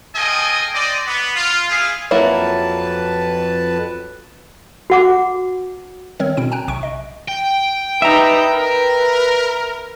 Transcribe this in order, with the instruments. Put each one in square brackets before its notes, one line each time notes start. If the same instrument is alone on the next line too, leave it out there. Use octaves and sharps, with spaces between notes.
[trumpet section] F4 G#4 A4 D#5 G5 G#5
C4 D5 D#5
B3
F4
E4 G#4 F5
[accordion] F2 B4 A5 [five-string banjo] F#3 A#3 E4
[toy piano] F#4 F#5 D6
[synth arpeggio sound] D#3 G3 C4 A#4 C#5
B2 C4 E4 D7
G5 G#5 A#5 F#6
B1 C3 C#6 D7
D#5
[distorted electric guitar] G5
[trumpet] G3 [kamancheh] D#4 B4 [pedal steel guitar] E5 A#5
[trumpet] A#4 [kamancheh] B4